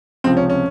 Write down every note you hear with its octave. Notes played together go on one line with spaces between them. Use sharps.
C#2 C3 F3 C4
C#4
C#4